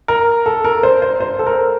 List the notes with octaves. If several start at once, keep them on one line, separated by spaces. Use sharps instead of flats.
A#4
A4
A#4
C5
C5
C5
A4
A#4